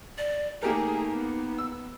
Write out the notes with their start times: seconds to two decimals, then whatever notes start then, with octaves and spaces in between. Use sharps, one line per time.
0.18 D5
0.63 A3 A#3 D#4 G4 G#4 A#4
1.10 B3
1.58 E6